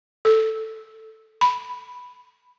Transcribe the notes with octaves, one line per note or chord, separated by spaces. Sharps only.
A4
B5